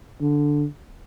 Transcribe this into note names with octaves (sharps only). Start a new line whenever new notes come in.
D3